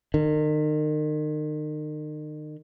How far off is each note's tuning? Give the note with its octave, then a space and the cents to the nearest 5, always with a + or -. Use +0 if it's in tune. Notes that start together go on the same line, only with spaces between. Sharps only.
D#3 -35